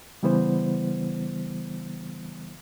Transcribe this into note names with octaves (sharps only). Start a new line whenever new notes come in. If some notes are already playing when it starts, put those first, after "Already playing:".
C#3 E3 G3 B3 E4 C5